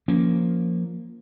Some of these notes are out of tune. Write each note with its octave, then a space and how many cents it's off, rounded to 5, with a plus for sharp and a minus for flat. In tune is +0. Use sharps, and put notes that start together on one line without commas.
F3 +0 A#3 +0 C#4 +10